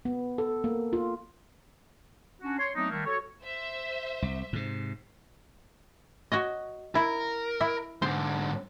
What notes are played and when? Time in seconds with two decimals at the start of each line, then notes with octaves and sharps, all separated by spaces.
0.05 B3
0.38 A4
0.64 A#3
0.93 F4
2.42 C#4 D4 F#4
2.59 C#5 C6
2.75 F#3 A3 B3 C4 D4 D#4
2.91 D#3 G3 A3 A#3
3.06 F#4 A4 C#5
3.46 C5 E5
4.22 C2
4.53 G#2 C3
6.32 F#4 C#5 D#5
6.95 E4 A#4
7.61 E4 E5
8.02 G#2 D3 C5